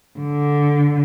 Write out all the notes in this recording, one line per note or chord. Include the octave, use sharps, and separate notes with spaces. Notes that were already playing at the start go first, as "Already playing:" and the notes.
D3